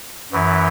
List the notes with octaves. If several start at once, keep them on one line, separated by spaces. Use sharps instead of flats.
F#2 E3